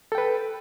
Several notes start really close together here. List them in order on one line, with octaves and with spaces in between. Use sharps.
A4 G5 B4